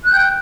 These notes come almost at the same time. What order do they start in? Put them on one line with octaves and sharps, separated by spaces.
F#6 G6 G5